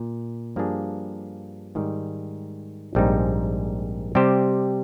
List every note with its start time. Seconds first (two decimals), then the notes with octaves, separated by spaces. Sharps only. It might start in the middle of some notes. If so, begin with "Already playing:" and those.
Already playing: A#2
0.56 G2 F3 A#3 D4 G#4
1.75 G#2 D#3 G3
2.95 A#1 G#2 G3 C4 D#4
4.15 C3 G3 C4 G4 C5